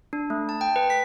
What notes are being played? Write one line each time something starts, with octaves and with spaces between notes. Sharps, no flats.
D4
A3
A5
G5
B4
B6